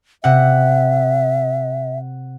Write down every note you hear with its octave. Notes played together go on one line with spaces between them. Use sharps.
C3 E5 F#5